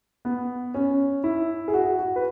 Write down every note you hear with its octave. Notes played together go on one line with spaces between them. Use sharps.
B3
C#4
E4
G#4
F#4
F#4
B4